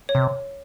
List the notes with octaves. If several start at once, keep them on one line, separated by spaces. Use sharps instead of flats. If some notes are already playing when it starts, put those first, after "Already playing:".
C#5
C3